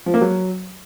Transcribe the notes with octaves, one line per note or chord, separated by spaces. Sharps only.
F3
A#3
F#3